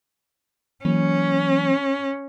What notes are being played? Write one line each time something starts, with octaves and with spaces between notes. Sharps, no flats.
E3 F#3 A#3 C#4